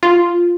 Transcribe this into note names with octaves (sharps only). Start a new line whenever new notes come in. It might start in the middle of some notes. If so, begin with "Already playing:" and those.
F4